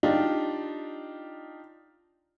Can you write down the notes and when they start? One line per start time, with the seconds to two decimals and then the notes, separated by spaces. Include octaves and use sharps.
0.03 D4 D#4 F4 G4